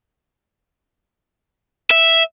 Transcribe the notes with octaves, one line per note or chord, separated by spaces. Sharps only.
E5